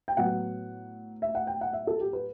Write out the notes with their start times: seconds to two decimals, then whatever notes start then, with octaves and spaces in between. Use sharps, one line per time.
0.08 G5
0.17 A2 F#3 B3 F#5
1.22 E5
1.35 F#5
1.47 G5
1.61 F#5
1.73 E5
1.87 A4
2.00 G4
2.13 B4